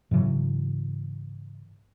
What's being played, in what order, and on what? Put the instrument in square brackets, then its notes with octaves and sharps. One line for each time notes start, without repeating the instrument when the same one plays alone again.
[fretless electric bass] G#2 C#3 E3 F#3